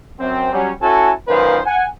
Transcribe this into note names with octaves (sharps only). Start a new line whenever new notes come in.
F#2 C4
F#3 G3 C#4
C#4 E4 F#4 A4 G#5 A5
F#2 A#2 D#3 B4 C5 F5
F#5 G#5